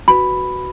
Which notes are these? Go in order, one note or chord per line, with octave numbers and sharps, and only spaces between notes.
F#4 B4 B5